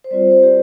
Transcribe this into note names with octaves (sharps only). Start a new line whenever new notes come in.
C5
G3 C4 F4 D5
C5
G4